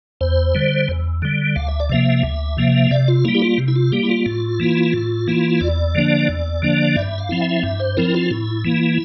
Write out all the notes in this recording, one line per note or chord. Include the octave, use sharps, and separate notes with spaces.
E2 C5
D3 G3
E2
D3 G3
D2 F5
E5
D5
C3 F3 A#3 E5
D2
C3 F3 A#3
C3 D5
F4
G3 A#3 E4
G4
F4
C3
E4
F4
G3 A#3 G4
E4
F4
A2
E3 A#3 E4
A2
E3 A#3 E4
E2 D5
D3 F3 A#3 D4
E2
D3 F3 A#3 D4
G2 E5
F5
F3 C4 E4
E5
G2 E5
C5
F3 C4 E4 A#4
F4
A2 E4
E3 A#3